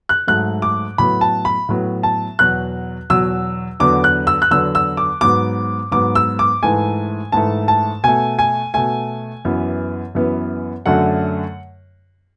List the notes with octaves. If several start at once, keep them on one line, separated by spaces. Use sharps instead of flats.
F#6
G#2 F#3 A3 F#6
D6
A2 F#3 B3 B5
A5
B5
A2 F#3 B3
A5
E2 B2 F#3 F#6
E2 B2 F#3 E6
E2 D3 F#3 B3 D6
F#6
E6
F#6
E2 D3 F#3 B3 E6
E6
D6
G#2 F#3 B3 D6
G#2 F#3 B3 D6
E6
D6
G#2 E3 A3 G#5
G#2 E3 A3 A5
A5
B2 A3 G#5
G#5
B2 A3 G#5
F#2 E3 B3
F#2 E3 B3
F#2 D3 F#3 A3 F#5